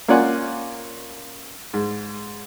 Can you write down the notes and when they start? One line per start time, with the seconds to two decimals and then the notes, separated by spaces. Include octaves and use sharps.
0.08 A#3 C#4 F4 D5 F#5 G#5
1.74 G#2